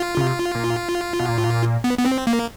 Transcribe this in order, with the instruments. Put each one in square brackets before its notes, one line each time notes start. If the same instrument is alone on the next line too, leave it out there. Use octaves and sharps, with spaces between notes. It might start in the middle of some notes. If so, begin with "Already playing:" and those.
Already playing: [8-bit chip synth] F4
[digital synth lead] C#3
C3
A#2
B2
A#2
A2
A#2
[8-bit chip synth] B3
B3
C4
A#3